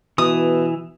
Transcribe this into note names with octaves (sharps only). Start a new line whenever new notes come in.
B2 E3 D#6